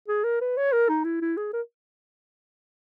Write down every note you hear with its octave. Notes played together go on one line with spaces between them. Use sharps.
G#4
A#4
B4
C#5
A#4
D#4
E4
E4
G#4
A#4